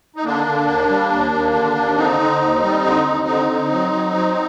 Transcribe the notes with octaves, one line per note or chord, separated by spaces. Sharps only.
D#4
D3 A#3 D4
D3
D#2
G3
D#2
D#2
D3
D#2
D3 C4 D#4
D3
D#2
G3
D3
D#2
D3
D3
F#3
F#3
F#3